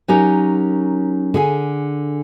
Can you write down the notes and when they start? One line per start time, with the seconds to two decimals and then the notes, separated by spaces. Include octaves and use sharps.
0.08 F#3 C#4 D#4 G4 A#4
1.34 D3 G#4 G#5